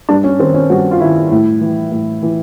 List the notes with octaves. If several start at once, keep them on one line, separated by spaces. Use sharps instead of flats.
G2 D4
C#4
D#3 C4
C#4
G2 F#4
F4
D#3 E4
A2
E3
A2
E3